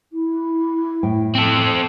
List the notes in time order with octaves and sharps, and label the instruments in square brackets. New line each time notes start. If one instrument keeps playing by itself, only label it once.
[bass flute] E4
[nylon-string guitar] A2 G5
[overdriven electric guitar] C4 A4